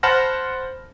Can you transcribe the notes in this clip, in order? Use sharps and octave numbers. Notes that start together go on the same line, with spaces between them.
C5 F#5 A5 B5 F6 A#6